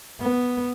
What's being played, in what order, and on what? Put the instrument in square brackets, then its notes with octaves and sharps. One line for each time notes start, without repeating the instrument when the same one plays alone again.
[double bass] B3